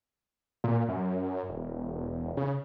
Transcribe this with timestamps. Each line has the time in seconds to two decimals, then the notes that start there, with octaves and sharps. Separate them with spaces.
0.64 A#2
0.88 F#2
1.49 E1
2.37 C#3